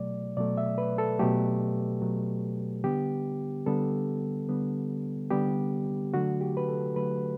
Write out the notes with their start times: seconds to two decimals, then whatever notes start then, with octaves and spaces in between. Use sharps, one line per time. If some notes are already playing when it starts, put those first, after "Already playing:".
Already playing: B2 F#3 A3 D5
0.37 B2 F#3 A3 D5
0.57 E5
0.78 B4
0.98 A4
1.19 B2 F#3 A3 G4
2.02 B2 F#3 A3
2.84 D3 G3 B3 G4
3.66 D3 G3 B3 A4
4.49 D3 G3 B3
5.30 D3 G3 B3 G4
6.14 D3 F#3 A3 F#4
6.41 G4
6.57 B4
6.69 A4
6.96 D3 F#3 A3 B4